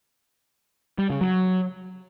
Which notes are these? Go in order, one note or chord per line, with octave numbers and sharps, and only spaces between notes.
G3
C#3
F#3